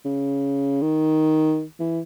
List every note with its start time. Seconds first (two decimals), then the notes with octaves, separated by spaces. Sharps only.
0.05 C#3
0.82 D#3
1.80 E3